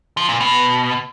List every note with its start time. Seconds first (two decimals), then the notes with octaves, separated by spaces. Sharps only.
0.17 F3
0.29 A#2
0.40 B2